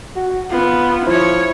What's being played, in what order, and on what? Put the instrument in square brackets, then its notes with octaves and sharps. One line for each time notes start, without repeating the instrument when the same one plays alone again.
[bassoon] F#4
[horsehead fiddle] B3 [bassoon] F4
[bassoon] F3 [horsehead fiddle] E4 C#5